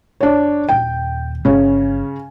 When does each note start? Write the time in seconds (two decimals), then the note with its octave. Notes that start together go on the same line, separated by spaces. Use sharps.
0.21 F#1 D4 C#5
0.69 D#1 D#2 G5
1.45 G1 C#3 C#4